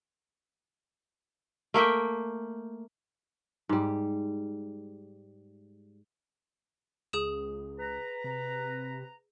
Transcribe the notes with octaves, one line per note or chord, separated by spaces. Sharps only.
A3 A#3 E5 G5
G#2 G3
C#2 G#4 D#6 E7
B4 A#5
C3